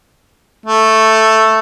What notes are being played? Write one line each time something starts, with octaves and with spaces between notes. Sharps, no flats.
A3